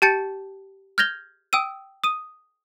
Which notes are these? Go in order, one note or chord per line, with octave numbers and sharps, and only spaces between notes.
G4 G5 A5 G6 A6 C#7
F6 G6 G#6 A#6 F7 G7
G5 D#6 E6 D#7
D#6 D#7